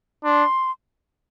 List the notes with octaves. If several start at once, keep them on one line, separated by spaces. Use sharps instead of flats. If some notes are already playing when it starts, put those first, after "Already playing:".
D4 C6